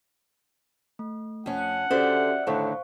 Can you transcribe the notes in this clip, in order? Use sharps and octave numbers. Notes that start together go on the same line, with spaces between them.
A3
F2 C#4 F#5
D3 C#4 F#4 G4 C5 D5 E5
A2 D3 D#3 A3 C5 F5 C#6